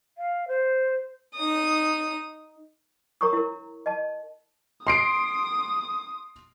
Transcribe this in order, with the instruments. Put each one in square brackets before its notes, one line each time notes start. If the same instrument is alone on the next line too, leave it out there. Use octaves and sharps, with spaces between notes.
[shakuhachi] F5
C5
[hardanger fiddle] D#4 D#6
[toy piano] A#4 C#5 A#5 C#6 D#6
E4 A#4
D#5 A5
[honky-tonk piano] C6 C7 D7 [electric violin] D#6